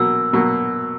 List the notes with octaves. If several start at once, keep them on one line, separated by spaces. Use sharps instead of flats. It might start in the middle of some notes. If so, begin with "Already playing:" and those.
Already playing: B2 F#3 A#3 E6
B2 F#3 A#3